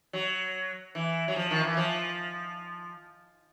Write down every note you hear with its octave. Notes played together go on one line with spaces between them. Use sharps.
F#3
E3
F#3
F3
D#3
E3
F3